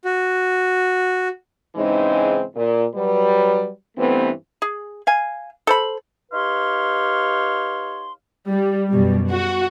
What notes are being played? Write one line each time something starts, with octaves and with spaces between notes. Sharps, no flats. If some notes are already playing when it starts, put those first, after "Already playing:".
F#4
G#2 C#3 E3 G#3 C4 D#4
A#2
F#3 G3 B4
G2 E3 A3 B3 C4
G#4
F5 G#5
A4 C5 B5
D#4 G4 B4 C#5 F5 C6
G3
F#2 B2 G3
F#4